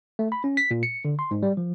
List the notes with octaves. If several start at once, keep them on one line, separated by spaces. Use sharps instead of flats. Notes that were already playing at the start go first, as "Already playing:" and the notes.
A3
B5
C#4
B6
A#2
C#7
D3
C6
G#2
G3
F3